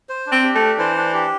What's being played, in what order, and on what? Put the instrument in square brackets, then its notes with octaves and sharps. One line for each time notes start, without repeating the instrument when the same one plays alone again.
[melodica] C5
D4
[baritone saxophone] C4
[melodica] G4
[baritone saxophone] A3
[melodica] D4
[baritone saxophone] E3 [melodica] C5
[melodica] D4
G4